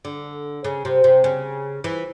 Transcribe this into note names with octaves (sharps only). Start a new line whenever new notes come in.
D3
C#3
C3
C3
C#3
E3